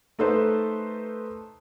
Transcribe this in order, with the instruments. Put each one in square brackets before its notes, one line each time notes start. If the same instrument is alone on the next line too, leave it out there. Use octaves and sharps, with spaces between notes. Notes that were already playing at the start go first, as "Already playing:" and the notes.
[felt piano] A3 D#4 A4 B4 C5